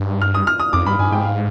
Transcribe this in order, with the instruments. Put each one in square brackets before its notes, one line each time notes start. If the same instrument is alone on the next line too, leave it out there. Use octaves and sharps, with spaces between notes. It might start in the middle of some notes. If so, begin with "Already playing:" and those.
Already playing: [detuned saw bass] G2
[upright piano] F6
D#6
F6
D#6
[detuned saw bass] F2 [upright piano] D6
[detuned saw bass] G2 [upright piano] B5
[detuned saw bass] G2 [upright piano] G#5
[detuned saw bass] G#2 [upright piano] G5
[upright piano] F5